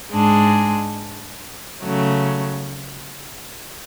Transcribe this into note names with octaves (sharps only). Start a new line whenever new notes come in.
G#2 G#3 D4 G#4
C#3 F#3 A3